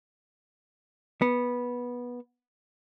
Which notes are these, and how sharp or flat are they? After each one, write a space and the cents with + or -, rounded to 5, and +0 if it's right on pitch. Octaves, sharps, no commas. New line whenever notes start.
B3 -15